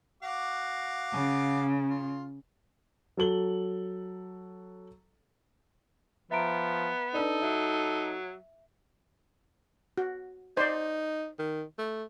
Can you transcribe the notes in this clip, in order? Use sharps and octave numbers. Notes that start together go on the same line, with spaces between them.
F#4 F5 D6
C#3
F4
F#3 A4 F#7 G7
F3 B3 E5 A#5 D7
D4 D#4 A4 B4 D5
F#3 E5
F#4
D#4 C5 D5
D#3
A3